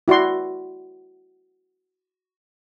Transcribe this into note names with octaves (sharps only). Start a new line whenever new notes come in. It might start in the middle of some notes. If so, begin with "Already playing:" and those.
E4 F#4 D5 C6